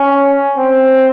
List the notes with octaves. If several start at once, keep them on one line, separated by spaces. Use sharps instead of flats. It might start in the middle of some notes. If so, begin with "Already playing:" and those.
Already playing: C#4
C4